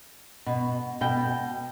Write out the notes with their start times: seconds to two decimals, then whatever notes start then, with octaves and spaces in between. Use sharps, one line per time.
0.46 B2
1.01 B2 G5